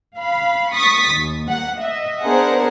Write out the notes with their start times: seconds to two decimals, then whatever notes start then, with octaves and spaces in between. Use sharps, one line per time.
0.17 F5 B5
0.74 C#6 D#6 A6 B6
1.13 D#2
1.49 A#3 F#5
1.81 D#5 E5
2.24 B3 D4 G#4 A#4 C5 F#5